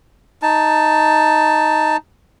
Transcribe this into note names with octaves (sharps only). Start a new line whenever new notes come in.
D#4 A5